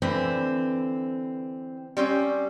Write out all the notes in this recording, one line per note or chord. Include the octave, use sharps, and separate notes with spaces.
D3 E3 C4 B4
G3 C4 C#4